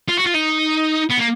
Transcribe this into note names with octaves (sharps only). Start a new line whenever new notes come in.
F4
F#4
F4
D#4
B3
A#3